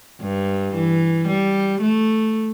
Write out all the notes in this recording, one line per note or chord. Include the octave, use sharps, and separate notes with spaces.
G2
E3
G3
A3